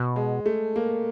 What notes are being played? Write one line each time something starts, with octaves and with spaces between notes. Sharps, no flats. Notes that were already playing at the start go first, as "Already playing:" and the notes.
Already playing: B2
G#3
A3
A#3